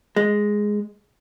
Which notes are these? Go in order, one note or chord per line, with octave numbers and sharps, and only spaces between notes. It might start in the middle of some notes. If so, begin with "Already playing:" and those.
G#3